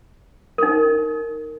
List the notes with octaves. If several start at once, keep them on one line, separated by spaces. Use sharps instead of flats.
D#4 A#4